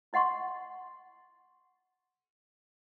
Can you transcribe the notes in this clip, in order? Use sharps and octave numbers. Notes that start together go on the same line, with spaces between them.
E4 D#5 F#5 C6 C#6